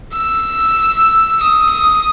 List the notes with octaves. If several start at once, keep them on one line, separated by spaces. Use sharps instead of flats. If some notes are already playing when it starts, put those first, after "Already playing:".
E6
D#6
D#6